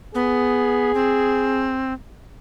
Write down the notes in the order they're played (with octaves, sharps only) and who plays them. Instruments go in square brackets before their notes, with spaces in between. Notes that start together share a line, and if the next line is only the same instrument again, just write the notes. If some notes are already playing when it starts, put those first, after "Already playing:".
[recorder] B3 [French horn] G#4
[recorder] C4